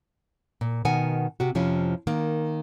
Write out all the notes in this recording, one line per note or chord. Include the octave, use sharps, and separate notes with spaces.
A#2
B2 D#3 A#4 F#5 G#5
C3 F#4
F2 C3 F3 C#4 E4
D#3 A#3